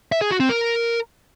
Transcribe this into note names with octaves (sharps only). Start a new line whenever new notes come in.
E5
G#4
F#4
C4
A#4